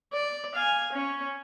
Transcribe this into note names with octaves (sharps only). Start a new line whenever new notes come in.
D5
F5 G#5
C#4